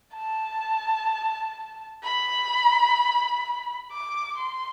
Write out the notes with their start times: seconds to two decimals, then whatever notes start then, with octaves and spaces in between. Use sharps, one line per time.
0.15 A5
2.03 B5
3.92 D6
4.38 C6